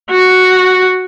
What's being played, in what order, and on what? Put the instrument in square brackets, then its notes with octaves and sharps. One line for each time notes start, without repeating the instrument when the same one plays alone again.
[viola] F#4